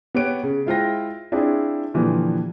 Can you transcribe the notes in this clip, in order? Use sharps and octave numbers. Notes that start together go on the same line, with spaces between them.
B3 G4 C#5 D7
C#3
G#3 E4 F4 C5 G5 A#6
C4 D4 E4 F4 G#4
A#2 D3 E3 F3 G3